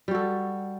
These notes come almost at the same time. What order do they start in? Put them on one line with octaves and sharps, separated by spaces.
G3 F#4 A4